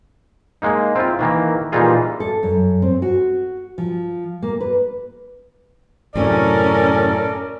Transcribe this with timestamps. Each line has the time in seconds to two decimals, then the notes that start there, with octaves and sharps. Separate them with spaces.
0.62 G#3 A#3 D#4
0.96 C4 E4 F4
1.19 D#3 E3 A#3
1.72 A#2 E3 G3 D#4 F4 G#4
2.20 A4
2.43 F#2
2.82 C4
3.02 F#4
3.78 F3
4.42 A#3
4.61 B4
6.16 F#2 A2 C3 C#4 A4 A#4 D5